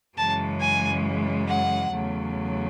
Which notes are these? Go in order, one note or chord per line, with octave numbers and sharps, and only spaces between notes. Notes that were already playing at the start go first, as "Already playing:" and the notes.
F#2 C#3 E3 G#3 A5
G#5
F#5
E2 C#3 F#3 A3